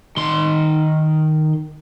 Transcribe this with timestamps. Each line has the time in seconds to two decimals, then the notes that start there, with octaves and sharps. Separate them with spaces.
0.17 D#3 C6